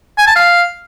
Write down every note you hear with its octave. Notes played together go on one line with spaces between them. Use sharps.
G#5
A5
F5